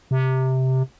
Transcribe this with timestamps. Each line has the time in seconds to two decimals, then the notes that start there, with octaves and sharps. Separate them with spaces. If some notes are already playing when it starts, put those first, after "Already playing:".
0.11 C3